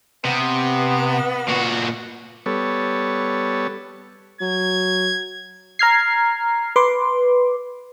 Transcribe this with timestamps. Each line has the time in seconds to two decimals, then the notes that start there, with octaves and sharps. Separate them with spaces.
0.25 C3 B3
1.48 A#2 F#4
2.46 G3 B3 A4 C#5
4.41 F#3 G#6
5.79 A#5 F6 G#6 C7
6.76 B4 C6 D6